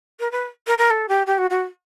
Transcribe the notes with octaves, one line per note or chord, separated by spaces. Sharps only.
A#4
B4
A#4
A#4
A4
G4
G4
F#4
F#4